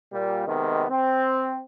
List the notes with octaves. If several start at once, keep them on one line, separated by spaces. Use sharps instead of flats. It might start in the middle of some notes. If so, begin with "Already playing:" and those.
A#2 G3
C3 D#3 G#3 B3
C4